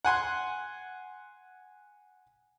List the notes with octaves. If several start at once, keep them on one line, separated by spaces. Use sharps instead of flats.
F#5 G#5 C6